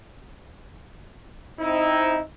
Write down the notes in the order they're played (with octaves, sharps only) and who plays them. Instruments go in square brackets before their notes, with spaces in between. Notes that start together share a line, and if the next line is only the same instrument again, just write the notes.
[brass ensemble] C4 D#4 E4